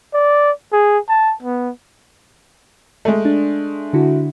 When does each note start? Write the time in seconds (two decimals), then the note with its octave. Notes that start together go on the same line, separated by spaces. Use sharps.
0.14 D5
0.73 G#4
1.09 A5
1.43 B3
3.05 G#3 A3
3.25 D4
3.93 D3 E4 F#4